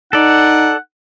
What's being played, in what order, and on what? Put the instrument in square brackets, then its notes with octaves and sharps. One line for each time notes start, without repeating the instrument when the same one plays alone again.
[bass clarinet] D#4 [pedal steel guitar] A4 D5 [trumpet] F#5